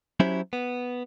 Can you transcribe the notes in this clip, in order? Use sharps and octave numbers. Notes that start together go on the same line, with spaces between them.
F#3 C#4 E4 F#4 G4 C5
B3